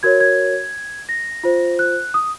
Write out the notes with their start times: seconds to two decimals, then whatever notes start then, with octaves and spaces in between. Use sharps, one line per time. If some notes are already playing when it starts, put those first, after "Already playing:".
0.03 F#4 A#4 C#5 G#6
0.20 G#6
1.09 A#6
1.44 F4 C5
1.79 F#6
2.14 D#6